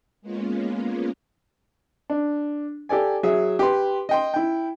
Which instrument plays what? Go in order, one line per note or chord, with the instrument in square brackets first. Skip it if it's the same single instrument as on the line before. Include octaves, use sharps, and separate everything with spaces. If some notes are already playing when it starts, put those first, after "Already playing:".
[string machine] G#3 A#3 B3 C#4 F4
[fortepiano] D4
G4 A4 D5 G#5
F#3 G#4 E5
G4 B4 C6
D#5 G5 C6
E4 G5